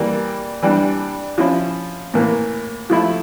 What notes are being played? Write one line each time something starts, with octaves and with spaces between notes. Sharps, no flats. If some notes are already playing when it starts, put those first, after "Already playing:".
Already playing: E3 G3 A#3
E3 G3 D4
F3 C#4 E4
A2 E3 A#3
F3 A3 E4